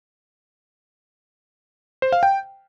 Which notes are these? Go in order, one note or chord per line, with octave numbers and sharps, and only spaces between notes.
C5
F5
G5